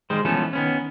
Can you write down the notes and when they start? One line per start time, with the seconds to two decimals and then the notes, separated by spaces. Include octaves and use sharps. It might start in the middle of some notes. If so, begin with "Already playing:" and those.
0.10 D#3 G3 G#3 C5
0.25 E3 F3 A3 B3 C#4 A4
0.53 D#3 B3 C#4